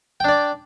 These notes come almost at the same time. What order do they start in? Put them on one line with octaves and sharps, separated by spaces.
G5 D4 D5